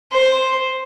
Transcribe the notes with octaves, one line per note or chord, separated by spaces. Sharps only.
C5